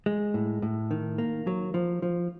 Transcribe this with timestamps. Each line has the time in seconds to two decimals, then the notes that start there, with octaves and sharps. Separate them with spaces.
0.06 G#3
0.34 A2
0.62 A2
0.91 D#3
1.18 A#3
1.47 F#3
1.74 F3
2.02 F3